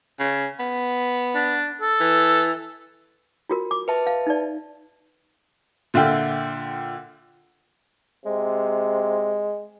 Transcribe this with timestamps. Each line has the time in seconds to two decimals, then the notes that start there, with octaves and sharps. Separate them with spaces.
0.19 C#3
0.60 B3
1.35 D4
1.82 A4
2.01 E3
3.49 F4 F#4 A#4
3.71 D6
3.88 B4 E5 A5
4.07 F5
4.27 D#4 D5
5.94 A#2 D3 F4 E5 G5
8.26 C3 G#3